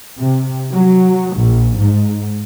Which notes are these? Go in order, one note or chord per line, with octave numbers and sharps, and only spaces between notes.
C3
F#3
A#1
G#2